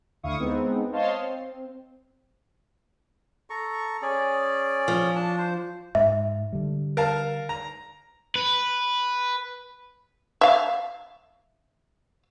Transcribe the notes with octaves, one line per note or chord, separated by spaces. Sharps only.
D2 D3 E4 F5 C#6 D#6
G#3 B3 C4 D#4
C5 C#5 D#5 F5 A5 C6
C4
A4 A#5 C#6
C#4 G#4 D5
F3
D4 A5
C5
G#2 E5
D3 G3
A#4 F5 A5
A#5
B4
E5 F5